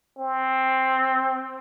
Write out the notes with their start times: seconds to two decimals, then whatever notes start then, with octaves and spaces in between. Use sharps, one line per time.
0.18 C4